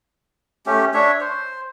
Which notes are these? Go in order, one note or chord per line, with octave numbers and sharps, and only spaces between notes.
A3 C#4 G4
D4 C#5 E5
C5